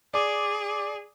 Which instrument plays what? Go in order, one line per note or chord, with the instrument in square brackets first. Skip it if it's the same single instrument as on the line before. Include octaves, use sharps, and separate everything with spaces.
[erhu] G#4 [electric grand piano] D5 D6